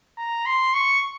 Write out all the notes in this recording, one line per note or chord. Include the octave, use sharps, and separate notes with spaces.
A#5
C6
C#6